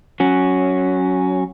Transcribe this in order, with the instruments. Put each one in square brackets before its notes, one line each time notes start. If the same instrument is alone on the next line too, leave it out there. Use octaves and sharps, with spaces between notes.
[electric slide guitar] F#3 C#4